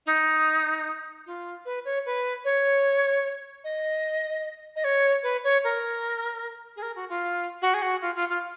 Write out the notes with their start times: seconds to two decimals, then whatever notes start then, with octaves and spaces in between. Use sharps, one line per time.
0.06 D#4
1.26 F4
1.65 B4
1.85 C#5
2.06 B4
2.45 C#5
3.64 D#5
4.76 D#5
4.84 C#5
5.23 B4
5.44 C#5
5.64 A#4
6.76 G#4
6.82 A#4
6.96 F#4
7.09 F4
7.62 F#4
7.74 G#4
7.82 F#4
8.02 F4
8.16 F4
8.29 F4